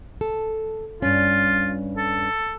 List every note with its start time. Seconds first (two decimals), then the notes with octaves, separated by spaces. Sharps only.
0.21 A4
1.02 G2 C#4 F4
1.98 A4